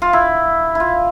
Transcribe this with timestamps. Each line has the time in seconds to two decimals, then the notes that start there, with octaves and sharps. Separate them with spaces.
0.02 F4
0.13 E4
0.75 E4 F4